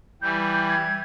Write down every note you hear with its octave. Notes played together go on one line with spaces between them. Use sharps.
E3 G3 G6
G#6